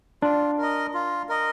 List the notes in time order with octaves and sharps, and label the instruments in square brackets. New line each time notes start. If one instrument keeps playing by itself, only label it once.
[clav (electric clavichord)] D4 [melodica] F4
[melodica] A#4 D#5
F4
A#4 D#5